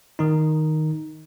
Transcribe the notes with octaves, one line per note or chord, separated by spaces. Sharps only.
D#3 D#4